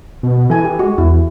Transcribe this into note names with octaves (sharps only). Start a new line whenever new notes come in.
B2
B2
E3 A4 G#5
G4
G#3 F#4
E2 E4